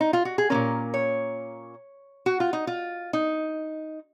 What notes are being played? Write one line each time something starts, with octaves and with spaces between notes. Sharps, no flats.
D#4
F4
F#4
G#4
A#2 F3 A#3 C#4 A#4
C#5
F#4
F4
D#4
F4
D#4